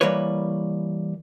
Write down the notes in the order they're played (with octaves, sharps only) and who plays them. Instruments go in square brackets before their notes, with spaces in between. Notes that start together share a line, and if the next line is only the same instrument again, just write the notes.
[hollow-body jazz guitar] E3 G3 A#3 B4 C#5